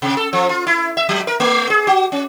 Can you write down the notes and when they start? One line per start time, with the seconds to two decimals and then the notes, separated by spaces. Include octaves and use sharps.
0.02 C3
0.17 A4
0.33 F3
0.49 F4
0.67 E4
0.97 E5
1.09 F#3
1.27 A#4
1.40 A3
1.70 G#4
1.87 F#4
2.12 C#4